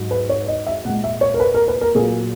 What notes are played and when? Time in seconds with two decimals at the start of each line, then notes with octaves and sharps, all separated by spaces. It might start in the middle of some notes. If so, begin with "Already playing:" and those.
Already playing: G#2 F#3
0.11 B4
0.29 C#5
0.48 D#5
0.67 E5
0.85 A#2 F#5
0.89 G#3
1.04 E5
1.21 C#5
1.34 A#4
1.40 B4
1.55 A#4
1.68 B4
1.81 A#4
1.95 A#2 G#4
2.00 F#3